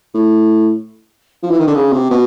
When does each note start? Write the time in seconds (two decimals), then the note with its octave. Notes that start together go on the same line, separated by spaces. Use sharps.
0.14 A2
1.43 F3
1.50 E3
1.59 D#3
1.67 D3
1.75 C#3
1.93 C3
2.10 B2